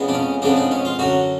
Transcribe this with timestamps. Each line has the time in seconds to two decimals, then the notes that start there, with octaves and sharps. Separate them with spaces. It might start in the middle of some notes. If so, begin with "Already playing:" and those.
Already playing: F2 C#3 G#3 B3
0.08 D4
0.14 C#4
0.42 F2 C#3 G#3 B3 D4
0.56 D4
0.71 C#4
0.85 F4
0.99 F#2 D3 F#3 F#4